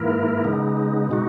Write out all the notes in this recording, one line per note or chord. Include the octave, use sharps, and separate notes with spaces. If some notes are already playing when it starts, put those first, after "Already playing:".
Already playing: G#2 E3 A#3 E4 A#4
C#3 G#3 B3 D#4
B2 G#3 D#4 F#4